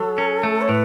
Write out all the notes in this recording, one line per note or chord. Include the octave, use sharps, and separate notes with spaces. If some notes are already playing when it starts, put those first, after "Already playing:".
Already playing: F#3 A4
C#4
A3
C#5
A2 B4